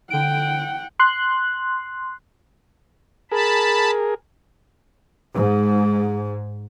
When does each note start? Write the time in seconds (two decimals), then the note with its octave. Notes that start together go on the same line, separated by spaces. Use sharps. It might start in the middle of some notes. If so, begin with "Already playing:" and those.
0.10 D3 F#5 G5 D7
1.00 C6 F#6
3.32 G#4 A#4 A5 B5
5.33 G#2